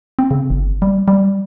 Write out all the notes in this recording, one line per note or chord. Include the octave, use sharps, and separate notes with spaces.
C4
C#3
G1
G3
G3